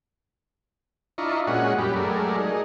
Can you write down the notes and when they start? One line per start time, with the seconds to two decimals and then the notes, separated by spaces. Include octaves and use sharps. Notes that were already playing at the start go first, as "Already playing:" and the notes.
1.18 D4 E4 F4 D#5 A#5 C#6
1.47 A#2 G#3 C#4 F#4 D#5 F#5
1.78 F#2 G3 G4 B5
1.96 F#3 G#3 A3 A#4 D5
2.38 D#4 G#4